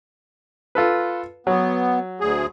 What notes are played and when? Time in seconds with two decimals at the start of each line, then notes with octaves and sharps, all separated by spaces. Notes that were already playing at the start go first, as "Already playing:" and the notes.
0.75 F4 A4 B4
1.47 F#3 B3
2.20 D2 G#4